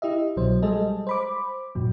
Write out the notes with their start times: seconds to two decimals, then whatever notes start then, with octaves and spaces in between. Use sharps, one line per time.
0.02 E4 G4 D#5 E5
0.36 C2 B2 F#3 C5
0.62 G3 G#3 G#4 A4 D#5
1.07 C5 B5 D6
1.75 F#2 A#2 F#3